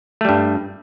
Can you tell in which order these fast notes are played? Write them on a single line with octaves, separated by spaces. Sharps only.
A3 G3 G2